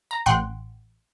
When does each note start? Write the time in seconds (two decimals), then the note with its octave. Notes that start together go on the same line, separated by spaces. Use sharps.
0.11 A#5
0.26 A1 F#5 G5 C6 F#6